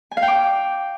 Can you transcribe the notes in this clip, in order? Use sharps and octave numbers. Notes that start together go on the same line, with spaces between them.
G#5
F5
G5
D6